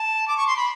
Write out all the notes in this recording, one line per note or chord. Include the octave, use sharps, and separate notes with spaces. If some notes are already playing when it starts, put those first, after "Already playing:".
Already playing: A5
D6
C#6
C6
B5